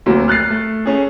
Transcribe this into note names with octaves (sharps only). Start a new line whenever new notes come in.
D2 C3 F#3 A3 A#3
F6 F#6 A6 C7
A3
A3 C#4 G#4